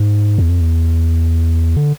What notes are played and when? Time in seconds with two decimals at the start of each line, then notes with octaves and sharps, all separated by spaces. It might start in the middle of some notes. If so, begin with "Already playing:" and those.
Already playing: G#2
0.38 E2
0.49 F2
0.61 E2
1.77 D3